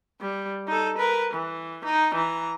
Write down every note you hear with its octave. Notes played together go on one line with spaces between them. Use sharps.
G3
D#4 A4
A#4 B4
E3
D#4
E3 A#5